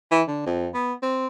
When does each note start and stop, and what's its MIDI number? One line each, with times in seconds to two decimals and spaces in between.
0.11 0.23 52
0.28 0.44 50
0.46 0.68 41
0.74 0.93 59
1.03 1.27 60